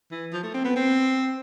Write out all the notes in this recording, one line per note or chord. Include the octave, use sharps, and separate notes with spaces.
E3
F3
A3
C4
B3
C4